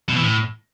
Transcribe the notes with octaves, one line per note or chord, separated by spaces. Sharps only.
B2
E3
A2